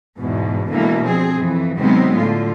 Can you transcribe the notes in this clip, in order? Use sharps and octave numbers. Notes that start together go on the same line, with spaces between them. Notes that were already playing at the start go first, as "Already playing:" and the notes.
E2 G#2 B2
B2 D3 E3 G#3 A#3
F3 C4 G#4
F2 E3
C3 D#3 F#3 G#3 B3 C4
A2 D3 F4